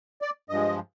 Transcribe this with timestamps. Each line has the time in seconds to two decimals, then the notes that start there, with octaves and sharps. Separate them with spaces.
0.22 D5
0.50 G2 F3 G#3 D#5